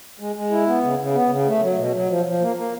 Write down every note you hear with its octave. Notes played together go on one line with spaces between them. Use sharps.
G#3
G#3
E4
B3
C#3
C#3
B3
C#3
A3
F#3
B2
F#3
F3
F3
A#3
A#3